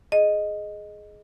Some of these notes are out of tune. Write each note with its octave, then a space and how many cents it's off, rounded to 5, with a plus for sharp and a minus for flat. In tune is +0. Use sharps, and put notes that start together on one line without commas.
G#4 +15 D#5 -5